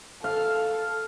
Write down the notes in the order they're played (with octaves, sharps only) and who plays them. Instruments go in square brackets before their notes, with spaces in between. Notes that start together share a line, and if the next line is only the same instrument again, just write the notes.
[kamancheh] A4 [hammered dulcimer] F5